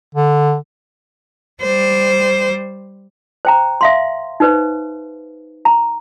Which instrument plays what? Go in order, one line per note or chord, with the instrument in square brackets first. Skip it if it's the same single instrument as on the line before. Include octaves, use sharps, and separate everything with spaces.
[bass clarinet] D3
[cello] G3 C5
[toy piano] C5 G5 A#5
E5 F5 C6
D#4 B4 C5
A#5